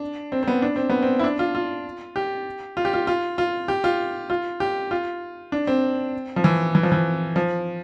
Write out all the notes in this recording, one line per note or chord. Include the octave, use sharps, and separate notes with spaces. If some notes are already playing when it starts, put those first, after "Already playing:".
Already playing: D4
C4
C4
B3
D4
C4
B3
C4
E4
D4
F4
F4
G4
F4
G4
F4
F4
F4
G4
F4
F4
G4
F4
D4
C4
F3
E3
E3
F3
E3
F3